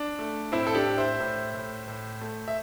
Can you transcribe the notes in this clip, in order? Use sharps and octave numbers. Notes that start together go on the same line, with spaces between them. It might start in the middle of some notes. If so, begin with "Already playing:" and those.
Already playing: D4
A3
A2 C4 E4
A4
D4 G4
A2
C5 E5
A2
A2
A2
A3
E5